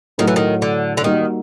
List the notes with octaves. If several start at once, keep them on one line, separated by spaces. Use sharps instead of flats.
A2 D#3 F#3 A3
E3
D#3
D3
D3
D#3 G3 A#3 D#4 F#4